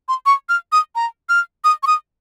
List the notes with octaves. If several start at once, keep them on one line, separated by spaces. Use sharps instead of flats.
C6
C#6
F6
D#6
A#5
F6
D#6
C#6
D#6